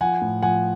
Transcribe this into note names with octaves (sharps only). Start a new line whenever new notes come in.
F3 F#5 G#5
A2
F3 F#5 G#5